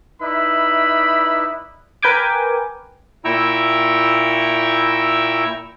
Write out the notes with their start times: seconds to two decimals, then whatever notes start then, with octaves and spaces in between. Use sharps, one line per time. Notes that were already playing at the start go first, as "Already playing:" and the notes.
0.21 D#4 E4 B4 D5 E5 B5
2.02 A#4 B4 G5 G#5 D6
3.25 A#2 E4 G5 A#5 C#6 E6